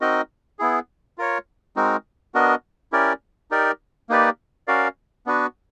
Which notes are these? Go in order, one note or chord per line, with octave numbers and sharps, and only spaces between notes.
C4 D#4 F#4 A#4 D#5
B3 E4 G#4
F4 A#4 C#5
G#3 C4 D#4 F#4 A#4
B3 D4 F#4 A#4 D#5
C#4 E4 G4 A#4 D5
D#4 G4 A#4 D5
A#3 D#4 G4 B4 D5
C#4 F#4 A#4 D5 F5
B3 D4 F#4 B4